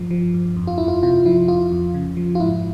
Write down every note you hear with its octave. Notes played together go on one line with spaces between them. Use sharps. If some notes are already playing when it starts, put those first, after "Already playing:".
Already playing: G2 F3
F3
G2
F2
F4
F2 E4
F4
C3 F4
F3 E4
F2 F4
F2
C#3
F3
F4
G#2 E4